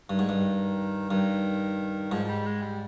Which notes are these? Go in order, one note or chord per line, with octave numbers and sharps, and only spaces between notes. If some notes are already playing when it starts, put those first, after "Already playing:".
G2 D#3
G#2
G2
G2 D#3
G#2 F3
F3
G3
G#3
G3